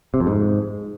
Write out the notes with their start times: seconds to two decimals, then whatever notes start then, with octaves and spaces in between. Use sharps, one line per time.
0.14 C3
0.20 F2
0.27 G#2